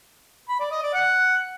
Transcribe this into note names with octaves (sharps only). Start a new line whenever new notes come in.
B5
D5
D#5
D5
F#5